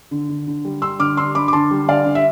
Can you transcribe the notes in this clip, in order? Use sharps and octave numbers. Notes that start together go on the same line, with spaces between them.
D3
D3
D3
G3
G3 C6 E6
D3 D6 F6
D4 C6 E6
D4 B5 D6
D6
D3 A5 C6
G3
D3 D5 F5
D3
E5